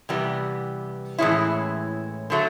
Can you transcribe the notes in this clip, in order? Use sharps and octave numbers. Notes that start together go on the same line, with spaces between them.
C3 E3 G3 B3
A2 E3 G#3 C#4 E4
D3 F#3 A3